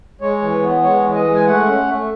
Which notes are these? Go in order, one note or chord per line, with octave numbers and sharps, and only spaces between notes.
G#3 C#5
E3
B3
G#3 C#5
E3
D#5
G#3
G#5
A3 F#5
C#4
A3